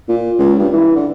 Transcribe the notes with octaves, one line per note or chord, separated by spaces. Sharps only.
A#2
C#2
G2
E3
D3